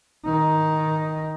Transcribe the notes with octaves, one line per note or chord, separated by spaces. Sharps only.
D#3 D#4